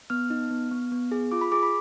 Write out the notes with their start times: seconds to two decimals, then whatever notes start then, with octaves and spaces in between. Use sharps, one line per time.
0.10 B3 F6
0.30 D#4
0.51 B3
0.71 B3
0.92 B3
1.12 G#4
1.32 F4 D6
1.41 B5
1.52 G#4 D6
1.63 B5